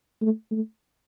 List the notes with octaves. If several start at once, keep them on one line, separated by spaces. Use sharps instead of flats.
A3
A3